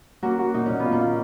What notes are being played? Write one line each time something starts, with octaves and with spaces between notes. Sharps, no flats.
A#3 C#4 F#4
F#4
A#2 D#4
A#2 C#4
B3
F4
A#3 C#4
F4